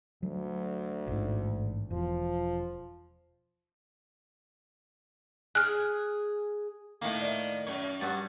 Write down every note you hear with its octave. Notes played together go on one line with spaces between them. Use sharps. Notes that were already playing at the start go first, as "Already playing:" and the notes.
D2 F#3
A1 G#2
E1 F3
G#4 F6 F#6
A2 D#3 A#3
D5 E5
F#2 C#5
G2 F#3 A6